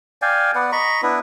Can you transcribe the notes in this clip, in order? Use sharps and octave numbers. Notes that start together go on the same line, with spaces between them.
D5 F5 G5 G#5
B3 B4 D5 F#5
D#5 A#5 B5 C#6
B3 D4 E4 B4